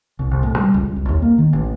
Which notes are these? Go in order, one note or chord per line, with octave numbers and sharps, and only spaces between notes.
C2
C2
A2
G3
C#2
C2
D#2
A#3
D#3
A1